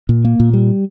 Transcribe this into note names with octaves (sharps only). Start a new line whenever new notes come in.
A#2
A#3
A#2
G3